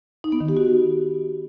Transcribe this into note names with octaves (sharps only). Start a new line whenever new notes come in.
D#4
B3
D#3
G4
F#4